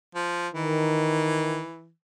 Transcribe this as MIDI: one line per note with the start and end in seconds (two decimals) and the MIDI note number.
0.15 0.48 53
0.54 1.61 51
0.54 1.90 52